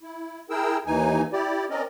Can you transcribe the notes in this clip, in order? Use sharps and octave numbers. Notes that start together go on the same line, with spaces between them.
E4
E4 G#4 A#4 G5 E6
D#2 E3 D#4 G#5
E4 G4 D5
C4 C#4 A#4 D5 D#5